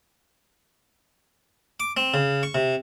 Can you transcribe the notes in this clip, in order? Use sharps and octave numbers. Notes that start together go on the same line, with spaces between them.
D6
C4
C#3
C#6
C3